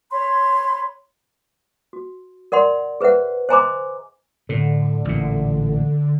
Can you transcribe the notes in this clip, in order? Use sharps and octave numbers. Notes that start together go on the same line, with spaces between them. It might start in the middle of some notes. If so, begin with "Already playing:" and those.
C#5 B5 C6
F#4
A#4 D5 F#5 C6
G#4 B4 C5 E5 F#5
C5 D#5 G#5 A#5 C6 D6
A2 D3
A1 A#2